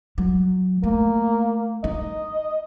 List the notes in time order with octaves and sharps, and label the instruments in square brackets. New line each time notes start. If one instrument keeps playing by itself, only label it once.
[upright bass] F#3
[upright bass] A3 [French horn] A#3
[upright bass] D#4 [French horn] D#5